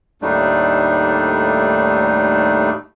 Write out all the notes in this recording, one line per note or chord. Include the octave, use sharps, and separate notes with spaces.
D#2 A2 G3 A3 D4 D#4